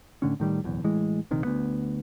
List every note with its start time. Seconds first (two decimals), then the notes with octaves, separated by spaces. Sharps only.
0.22 A2 D3 C#4
0.40 A2 D#3 G3
0.64 D1 B1 E2
0.84 A2 E3 G#3
1.31 A#1 C3 D#3
1.45 D2 B3